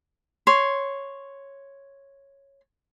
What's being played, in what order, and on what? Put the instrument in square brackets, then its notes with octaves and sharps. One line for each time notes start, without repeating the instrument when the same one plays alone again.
[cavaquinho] C#5 C6